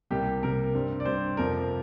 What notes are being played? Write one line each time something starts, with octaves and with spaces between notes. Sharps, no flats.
C2 C3 G3 A#3 G4
C2 C3 G3 A#3 A#4
G2 G3 C4
D5
G2 G3 C4 C5
F2 C3 F3 C4 A#4